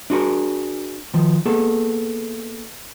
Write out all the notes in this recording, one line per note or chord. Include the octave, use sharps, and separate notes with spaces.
D4 F#4 G#4 A#4
D#3 F3
A#3 B3 G#4 A4